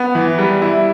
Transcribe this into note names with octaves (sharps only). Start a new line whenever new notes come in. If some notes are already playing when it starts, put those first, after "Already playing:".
Already playing: B3
E3
G3
E4